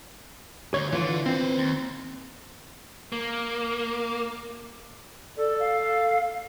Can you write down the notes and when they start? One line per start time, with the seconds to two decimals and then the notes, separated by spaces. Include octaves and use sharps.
0.74 D2 C#5
0.93 D3 E3 F4
1.26 C4 B4 C5
1.57 D#2
3.12 A#3
5.37 A4 D5
5.60 F5